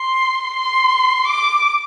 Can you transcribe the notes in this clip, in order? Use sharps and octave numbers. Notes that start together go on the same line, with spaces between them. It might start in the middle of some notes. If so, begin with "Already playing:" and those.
Already playing: C6
C6
D6